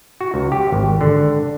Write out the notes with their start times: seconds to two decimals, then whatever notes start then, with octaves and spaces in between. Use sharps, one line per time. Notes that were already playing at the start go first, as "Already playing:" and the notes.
0.21 F#4
0.34 C#2
0.52 G4
0.72 G#1
1.01 D3